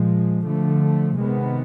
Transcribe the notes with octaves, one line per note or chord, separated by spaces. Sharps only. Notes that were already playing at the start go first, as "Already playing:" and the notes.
Already playing: A#2 F3 G#3
D3 F3 A3
C3 D#3 G#3 B3